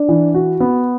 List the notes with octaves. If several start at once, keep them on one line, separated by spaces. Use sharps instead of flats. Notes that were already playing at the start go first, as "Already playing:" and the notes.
Already playing: D4
E3
F#4
B3